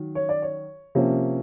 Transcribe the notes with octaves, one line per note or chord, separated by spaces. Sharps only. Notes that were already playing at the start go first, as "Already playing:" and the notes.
Already playing: D#3 F#3
C#5
D5
C#5
C3 F3 A#3 C#4